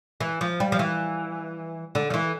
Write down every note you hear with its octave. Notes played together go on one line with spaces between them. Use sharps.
E3
F3
G3
F3
E3
D3
F3
E3